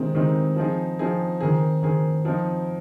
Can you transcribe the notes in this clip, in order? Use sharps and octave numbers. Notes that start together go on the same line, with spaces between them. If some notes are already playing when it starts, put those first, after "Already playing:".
Already playing: C3 D#3 G#3 C4 D#4
C3 D#3 G#3 C4 D#4
F3 C4 D#4 G#4
F3 C4 D#4 G#4
D#3 C4 G#4
D#3 C4 G#4
F3 C4 D#4